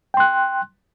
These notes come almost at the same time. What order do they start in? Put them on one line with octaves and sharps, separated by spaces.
G5 C6 F#6